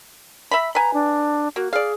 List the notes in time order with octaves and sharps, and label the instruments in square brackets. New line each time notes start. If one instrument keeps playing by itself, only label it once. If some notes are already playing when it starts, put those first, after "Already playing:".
[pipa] E5 A#5 B5
[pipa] B4 G#5 [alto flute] A#5
[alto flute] D4
[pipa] A#3 [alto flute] F#4
[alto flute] G#4 [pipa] D5 F5